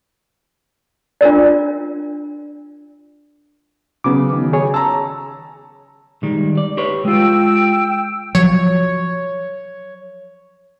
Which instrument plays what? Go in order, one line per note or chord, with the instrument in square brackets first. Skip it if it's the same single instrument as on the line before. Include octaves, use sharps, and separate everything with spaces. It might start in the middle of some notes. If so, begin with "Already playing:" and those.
[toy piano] D4 F4 A#4 D5
[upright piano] C#3 F#3 [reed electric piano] B3 D6
[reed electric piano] D#3
G#4 C#5
[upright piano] A5 A#5 [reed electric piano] E6
[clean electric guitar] D#3 G3 G#3
D5
G4 B4 C#5
[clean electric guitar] G#3 F4 [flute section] G5 E6
[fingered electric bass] F3 F#3 [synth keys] C#5